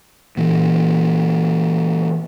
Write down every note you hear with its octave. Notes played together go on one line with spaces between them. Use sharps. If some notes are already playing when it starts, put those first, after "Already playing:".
A#2 E3